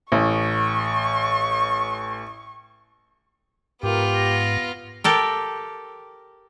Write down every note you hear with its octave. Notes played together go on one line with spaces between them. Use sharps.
A1 C#6
G#2 B3 F4 G4 A#4
A#6
G4 A4 A#4